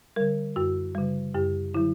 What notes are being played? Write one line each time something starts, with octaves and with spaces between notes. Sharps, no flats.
D3 G3 A#4
F#2 F#4
C#3 G3
F#2 G4
D3 F#3 E4